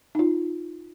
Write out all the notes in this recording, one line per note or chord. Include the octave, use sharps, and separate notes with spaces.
D#4 F4